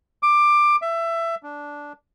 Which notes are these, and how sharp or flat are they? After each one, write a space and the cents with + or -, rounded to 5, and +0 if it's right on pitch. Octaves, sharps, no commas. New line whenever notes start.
D6 +15
E5 +20
D4 -10